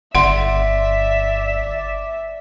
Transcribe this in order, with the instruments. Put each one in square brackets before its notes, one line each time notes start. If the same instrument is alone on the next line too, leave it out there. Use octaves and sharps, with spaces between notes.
[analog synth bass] G1 [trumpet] D5 [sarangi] E5 [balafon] F#5 C6